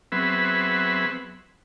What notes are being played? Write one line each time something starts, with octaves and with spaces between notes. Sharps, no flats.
F#3 B3 C4 G#4 B4 E5